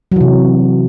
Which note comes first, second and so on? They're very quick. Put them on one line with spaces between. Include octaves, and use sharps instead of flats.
F#3 E3 C3